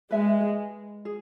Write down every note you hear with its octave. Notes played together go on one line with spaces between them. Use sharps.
G#3 B4 E5 G#5
G#4